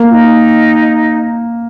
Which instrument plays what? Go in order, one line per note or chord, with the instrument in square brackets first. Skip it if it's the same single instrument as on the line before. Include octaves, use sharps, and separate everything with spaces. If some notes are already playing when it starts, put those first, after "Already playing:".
Already playing: [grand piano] A#3
[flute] F4
D#4